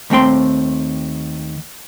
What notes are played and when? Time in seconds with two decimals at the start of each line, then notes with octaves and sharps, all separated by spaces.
0.10 D#2 A3 C4 G5 C6